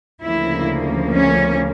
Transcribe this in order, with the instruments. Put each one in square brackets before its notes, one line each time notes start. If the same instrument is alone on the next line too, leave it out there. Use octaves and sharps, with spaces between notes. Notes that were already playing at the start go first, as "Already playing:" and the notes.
[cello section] D2 C#3 F3 A#3 E4
C#4